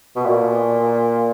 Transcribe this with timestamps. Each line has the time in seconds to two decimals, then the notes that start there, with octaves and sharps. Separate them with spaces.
0.16 B2
0.26 A#2